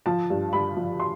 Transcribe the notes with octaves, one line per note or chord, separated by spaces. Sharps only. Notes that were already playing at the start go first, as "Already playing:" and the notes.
F3 A5
G2
G2 B5
F3
C6